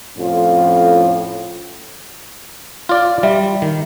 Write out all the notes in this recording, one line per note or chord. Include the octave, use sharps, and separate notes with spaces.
F2 A2 C#4 F4
F4 D5
G3 E5
D#3